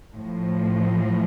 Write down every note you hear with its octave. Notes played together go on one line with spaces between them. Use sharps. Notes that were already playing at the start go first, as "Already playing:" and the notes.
A2 F3